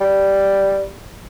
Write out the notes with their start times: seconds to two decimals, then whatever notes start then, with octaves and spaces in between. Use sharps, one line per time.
0.01 G3